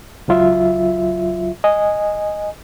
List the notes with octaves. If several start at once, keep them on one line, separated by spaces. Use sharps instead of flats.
C#2 F#3 F4 E5
D#5 G#5